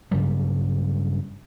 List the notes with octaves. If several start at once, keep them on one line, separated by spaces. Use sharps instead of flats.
G2 C#3 F#3 G3